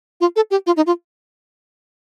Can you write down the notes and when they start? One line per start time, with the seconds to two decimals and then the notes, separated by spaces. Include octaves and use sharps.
0.21 F4
0.36 A4
0.51 G4
0.67 F4
0.77 D#4
0.87 F4